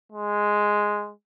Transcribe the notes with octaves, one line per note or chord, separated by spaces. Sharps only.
G#3